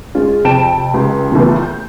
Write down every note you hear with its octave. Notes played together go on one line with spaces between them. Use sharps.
G#3 C#4 F4
F2 C3 G5 A5 D7 E7
C#2 G4
D#2 A#2 C#3 E3 A3 B3
G6